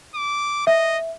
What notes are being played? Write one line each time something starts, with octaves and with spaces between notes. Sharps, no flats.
D6
D#5 E5